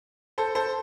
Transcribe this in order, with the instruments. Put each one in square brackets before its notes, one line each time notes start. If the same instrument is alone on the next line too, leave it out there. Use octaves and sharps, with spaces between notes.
[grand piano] A4 C5
A4 C5